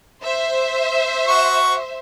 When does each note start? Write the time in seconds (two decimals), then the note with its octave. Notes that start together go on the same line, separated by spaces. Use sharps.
0.22 C5 E5
1.28 F#4 C#6